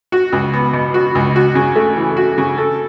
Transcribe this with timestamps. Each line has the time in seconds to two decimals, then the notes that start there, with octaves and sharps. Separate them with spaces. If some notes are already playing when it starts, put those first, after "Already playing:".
0.12 F#4
0.32 C#2
0.53 B3
0.73 B2
0.94 F#4
1.15 C#2
1.36 F#4
1.55 C#3
1.76 A3
1.97 E3
2.17 F#4
2.38 C#3
2.58 A4